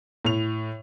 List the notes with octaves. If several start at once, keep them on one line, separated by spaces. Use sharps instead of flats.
A2 F7